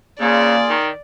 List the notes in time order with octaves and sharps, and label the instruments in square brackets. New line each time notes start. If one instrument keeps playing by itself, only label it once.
[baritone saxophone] C#3 [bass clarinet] A#3 [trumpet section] F4 G#4 [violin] D5
[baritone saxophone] D#3